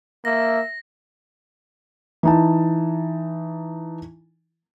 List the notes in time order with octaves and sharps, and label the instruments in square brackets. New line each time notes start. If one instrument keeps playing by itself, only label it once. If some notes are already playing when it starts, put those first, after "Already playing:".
[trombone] A#3 [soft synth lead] E5 [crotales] A#6
[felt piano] E3 D#4 A5